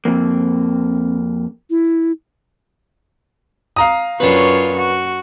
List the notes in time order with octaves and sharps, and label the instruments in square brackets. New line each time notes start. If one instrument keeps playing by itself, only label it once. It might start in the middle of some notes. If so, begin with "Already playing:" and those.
[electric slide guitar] F2 A#3 [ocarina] C4
[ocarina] E4
[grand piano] F5 A#5 D#6
[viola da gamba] F#2 F4 C#5 [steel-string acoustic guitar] D4 B4
[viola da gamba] F#4